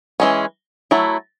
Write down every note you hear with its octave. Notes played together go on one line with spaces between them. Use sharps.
E3 G#3 C#4
F#3 A3 E4